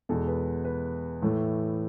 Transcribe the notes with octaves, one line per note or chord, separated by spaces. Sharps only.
E2 B2 G#3 A4
B4
B4
A2 E3 A3